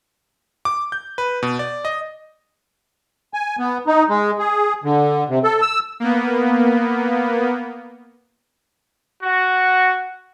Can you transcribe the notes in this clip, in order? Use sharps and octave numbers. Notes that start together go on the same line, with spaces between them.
D6
G6
B4
B2
D5
D#5
G#5
B3
D#4
G#3
G#4
D3
C3
A4
E6
A#3 B3
F#4